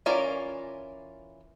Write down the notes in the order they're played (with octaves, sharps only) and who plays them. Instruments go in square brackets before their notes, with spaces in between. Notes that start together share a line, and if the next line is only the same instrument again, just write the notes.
[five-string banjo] E3 C#4 F4 A#4 D5